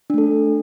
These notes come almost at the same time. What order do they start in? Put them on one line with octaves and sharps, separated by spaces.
D4 A3 A4